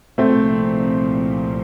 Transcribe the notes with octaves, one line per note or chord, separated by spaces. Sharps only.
C2 A#2 F3 A3 C4